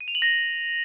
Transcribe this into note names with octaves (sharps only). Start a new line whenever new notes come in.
D#7
F7
F#7
A#6